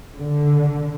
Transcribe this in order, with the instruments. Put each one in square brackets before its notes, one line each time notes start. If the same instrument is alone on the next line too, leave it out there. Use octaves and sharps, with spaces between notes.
[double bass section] D3